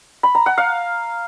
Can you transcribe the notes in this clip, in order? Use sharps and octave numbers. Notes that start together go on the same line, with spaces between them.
B5
A#5
F#5
F5